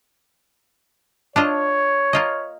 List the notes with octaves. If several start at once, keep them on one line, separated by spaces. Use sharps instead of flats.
D4 F4 C#5 D#5
A#3 F4 D#5